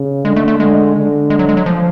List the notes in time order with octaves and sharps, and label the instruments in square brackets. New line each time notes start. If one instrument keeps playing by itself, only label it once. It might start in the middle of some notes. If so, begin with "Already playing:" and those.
Already playing: [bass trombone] C#3
[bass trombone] D3 [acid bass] G#3
[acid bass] A3
A3
[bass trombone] D3 [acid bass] G#3
[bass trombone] D3
[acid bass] G#3
F#3
G#3
F#3
F3